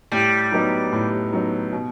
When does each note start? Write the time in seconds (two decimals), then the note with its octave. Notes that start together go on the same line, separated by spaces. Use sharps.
0.12 A2 G3
0.52 F#3 B3 D#4
0.92 A2
1.33 F#3 B3 D#4
1.72 B2